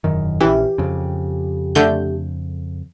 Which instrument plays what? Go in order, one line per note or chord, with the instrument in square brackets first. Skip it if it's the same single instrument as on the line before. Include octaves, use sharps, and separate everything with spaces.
[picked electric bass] E1 F#2 D#3
[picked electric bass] A#1 C#4 [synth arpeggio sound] E3 [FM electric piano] G4
[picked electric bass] F2 C#3
[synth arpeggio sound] D3 A3 G6